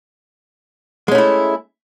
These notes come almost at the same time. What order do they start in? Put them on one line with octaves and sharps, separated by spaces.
G#3 C#4 A3 E4